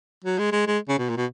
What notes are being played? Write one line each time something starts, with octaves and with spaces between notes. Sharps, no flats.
F#3
G#3
G#3
G#3
C#3
B2
A#2
B2